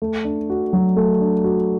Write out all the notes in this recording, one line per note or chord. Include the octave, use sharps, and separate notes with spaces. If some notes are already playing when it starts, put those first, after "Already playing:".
A3
D4
F#4
F#3
A3
D4
F#4